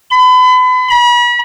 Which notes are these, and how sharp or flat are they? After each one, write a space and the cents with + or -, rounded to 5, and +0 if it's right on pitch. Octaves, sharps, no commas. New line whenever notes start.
B5 +35
B5 -40